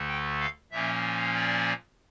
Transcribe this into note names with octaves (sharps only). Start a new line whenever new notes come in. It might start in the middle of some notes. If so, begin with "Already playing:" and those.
Already playing: D2 D3 A3
G5
F5
A#2 F3 A#3 C#4 E5
D5